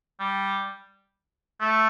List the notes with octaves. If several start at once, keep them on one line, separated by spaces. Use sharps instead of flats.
G3
A3